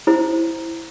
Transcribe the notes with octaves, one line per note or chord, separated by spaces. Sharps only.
E4 C5